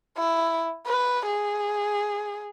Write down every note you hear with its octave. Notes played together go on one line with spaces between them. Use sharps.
E4
B4
G#4